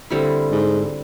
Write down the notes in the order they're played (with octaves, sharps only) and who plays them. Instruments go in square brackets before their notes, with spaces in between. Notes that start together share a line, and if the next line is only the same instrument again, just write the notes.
[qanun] D3 G3 C4 E4
[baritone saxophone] G#2